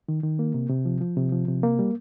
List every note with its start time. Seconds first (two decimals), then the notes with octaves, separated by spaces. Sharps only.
0.08 D#3
0.23 D#3
0.39 A#3
0.54 C3
0.70 C3
0.85 F3
1.01 F3
1.17 C3
1.32 F3
1.48 C3
1.63 A#3
1.79 G3